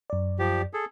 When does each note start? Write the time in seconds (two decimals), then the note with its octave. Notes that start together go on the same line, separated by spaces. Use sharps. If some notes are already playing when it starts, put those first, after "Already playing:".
0.10 F#2 D5
0.39 F3 G4
0.74 G#4 A4